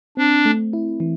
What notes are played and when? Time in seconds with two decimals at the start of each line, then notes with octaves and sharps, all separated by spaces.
0.17 C4 D4
0.45 A3
0.73 E4
1.00 E3